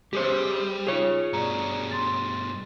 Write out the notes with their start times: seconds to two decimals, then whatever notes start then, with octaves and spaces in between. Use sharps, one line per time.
0.13 G3 G4 G#4 C5
0.87 D#4 F4 G#4 C#5 F7
1.33 G2 B2 D5 A#5
1.91 C6 A6